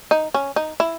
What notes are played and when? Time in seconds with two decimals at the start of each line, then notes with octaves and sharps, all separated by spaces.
0.11 D#4
0.34 C#4
0.56 D#4
0.80 E4